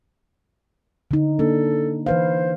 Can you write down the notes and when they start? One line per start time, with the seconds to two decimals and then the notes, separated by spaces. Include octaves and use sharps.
1.11 D3 D#4
1.39 A#3 D4 A4
2.06 E3 B4 C5 F5